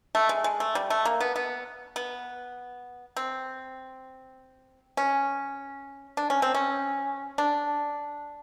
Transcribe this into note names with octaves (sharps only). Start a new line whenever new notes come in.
A3
G#3
G#3
A3
G3
A3
A#3
B3
B3
B3
C4
C#4
D4
C#4
C4
C#4
D4